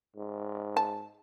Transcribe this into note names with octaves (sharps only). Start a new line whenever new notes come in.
G#2
A5